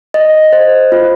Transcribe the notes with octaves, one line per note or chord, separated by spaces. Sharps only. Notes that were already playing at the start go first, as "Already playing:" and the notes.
D#5
C5
F4